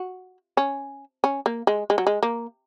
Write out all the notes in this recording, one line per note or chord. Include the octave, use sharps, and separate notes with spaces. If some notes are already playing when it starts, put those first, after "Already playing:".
Already playing: F#4
C#4
C#4
A#3
G#3
G#3
F#3
G#3
A#3